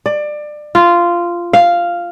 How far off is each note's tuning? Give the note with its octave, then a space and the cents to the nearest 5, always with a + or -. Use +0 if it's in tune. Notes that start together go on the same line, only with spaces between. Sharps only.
D5 +25
F4 -10
F5 -5